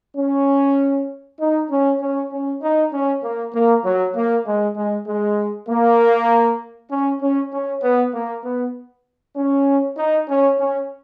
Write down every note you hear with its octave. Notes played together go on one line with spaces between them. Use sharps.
C#4
D#4
C#4
C#4
C#4
D#4
C#4
A#3
A#3
F#3
A#3
G#3
G#3
G#3
A#3
C#4
C#4
C#4
B3
A#3
B3
C#4
D#4
C#4
C#4